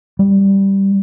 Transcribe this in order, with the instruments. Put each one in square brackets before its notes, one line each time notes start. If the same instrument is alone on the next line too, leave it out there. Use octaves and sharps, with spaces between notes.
[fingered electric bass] G3